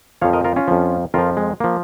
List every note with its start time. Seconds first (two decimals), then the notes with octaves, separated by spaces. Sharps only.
0.22 F2 F3 C#5 F5
0.33 A#4 D#5
0.44 F4 A#4
0.56 C#4 F4
0.68 F2 F3
1.14 F2 F3 F4 A#4
1.37 G#3
1.60 F3 A#3